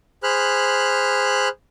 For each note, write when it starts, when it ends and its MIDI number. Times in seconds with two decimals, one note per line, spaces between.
0.23 1.49 68
0.23 1.49 72
0.23 1.49 83
0.23 1.49 89
0.23 1.49 90